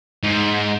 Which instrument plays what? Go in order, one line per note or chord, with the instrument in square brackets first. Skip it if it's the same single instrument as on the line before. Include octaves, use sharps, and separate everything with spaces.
[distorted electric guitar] G#2